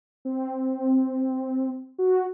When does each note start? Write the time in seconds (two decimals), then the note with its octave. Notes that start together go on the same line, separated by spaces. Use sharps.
0.25 C4
1.98 F#4